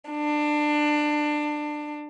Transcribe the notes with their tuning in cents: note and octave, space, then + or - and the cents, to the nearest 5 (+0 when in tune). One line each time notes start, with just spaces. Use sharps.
D4 +20